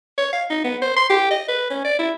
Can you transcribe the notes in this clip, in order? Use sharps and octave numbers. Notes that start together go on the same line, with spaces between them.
C#5
F5
D#4
B3
C5
C6
G4
D#5
B4
C#4
D5
E4